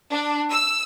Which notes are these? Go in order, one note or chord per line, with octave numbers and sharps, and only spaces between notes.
D4
E6